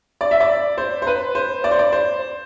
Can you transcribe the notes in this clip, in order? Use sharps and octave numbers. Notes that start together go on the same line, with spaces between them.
D5
E5
D5
C5
C5
B4
C5
D5
C5
D5
C5